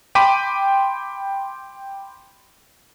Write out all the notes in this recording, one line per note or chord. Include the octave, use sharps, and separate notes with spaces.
G5 B5 C6 D6 B6 D#7